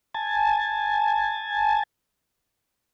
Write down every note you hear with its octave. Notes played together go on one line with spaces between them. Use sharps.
G#5 A5